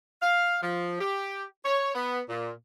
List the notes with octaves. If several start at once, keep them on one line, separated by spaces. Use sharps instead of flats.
F5
F3
G4
C#5
B3
A#2